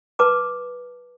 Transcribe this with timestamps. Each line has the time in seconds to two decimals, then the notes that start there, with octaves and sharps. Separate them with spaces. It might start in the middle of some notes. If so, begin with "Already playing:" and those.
0.19 B4 A5 D6